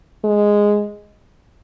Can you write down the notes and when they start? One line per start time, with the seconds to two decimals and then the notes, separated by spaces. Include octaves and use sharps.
0.25 G#3